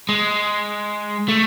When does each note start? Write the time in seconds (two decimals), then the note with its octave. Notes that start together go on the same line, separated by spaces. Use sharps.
0.09 G#3
1.28 A3